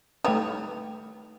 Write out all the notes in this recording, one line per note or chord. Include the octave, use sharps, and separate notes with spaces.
D#3 G3 A3 B4 C#5